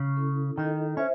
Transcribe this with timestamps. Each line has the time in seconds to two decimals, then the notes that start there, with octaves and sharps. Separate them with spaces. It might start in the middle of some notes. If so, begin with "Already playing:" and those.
Already playing: C#3
0.17 C#4 E4 A4
0.57 D#3 E4 A4 D#5
0.97 C#4 C5 E5